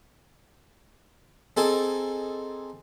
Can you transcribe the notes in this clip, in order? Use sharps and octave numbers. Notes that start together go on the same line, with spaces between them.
C4 D#4 G#4 A4 G#5 A5